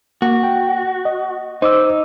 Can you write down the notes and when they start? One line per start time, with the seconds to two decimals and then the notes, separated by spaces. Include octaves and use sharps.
0.22 A#3 F#4
0.43 G5
1.05 D#5
1.62 D#4 C5 D6 E6